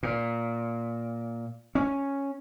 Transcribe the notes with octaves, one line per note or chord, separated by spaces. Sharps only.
A#2
C#4